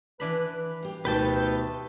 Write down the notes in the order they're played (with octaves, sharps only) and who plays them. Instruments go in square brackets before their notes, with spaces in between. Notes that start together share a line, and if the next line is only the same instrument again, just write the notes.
[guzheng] E3 D4 B5 [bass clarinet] B4
[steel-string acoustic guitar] G4 F5
[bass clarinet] D2 [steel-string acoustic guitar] B2 D#3 G4 [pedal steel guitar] B4 G5 A5